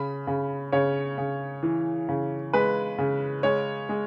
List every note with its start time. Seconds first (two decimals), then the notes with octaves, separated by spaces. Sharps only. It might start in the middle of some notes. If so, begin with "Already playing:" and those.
Already playing: C#3 B5
0.27 C#3
0.72 C#3 C#5
1.18 C#3
1.63 E3
2.09 C#3
2.53 G#3 B4
2.98 C#3
3.43 G#3 C#5
3.89 G#3